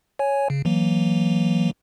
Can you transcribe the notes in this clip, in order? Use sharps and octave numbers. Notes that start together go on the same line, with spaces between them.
C#5 G#5
C#3
E3 F#3 A#3